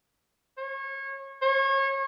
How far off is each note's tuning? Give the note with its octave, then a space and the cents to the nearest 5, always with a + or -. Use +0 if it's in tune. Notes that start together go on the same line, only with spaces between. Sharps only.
C#5 -30
C#5 -30